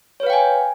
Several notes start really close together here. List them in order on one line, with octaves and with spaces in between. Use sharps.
C#5 B4 F5 G5 G#5